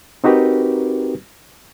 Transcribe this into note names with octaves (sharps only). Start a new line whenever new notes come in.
C4 D#4 F#4 G4 A#4 B4